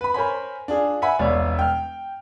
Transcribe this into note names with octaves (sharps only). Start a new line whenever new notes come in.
B4 B5
A#4 C5 C#5 G#5 B5
D4 F4 G#4
E5 F#5 G#5 B5
E1 C2 C#5 D5 F5
G5 F6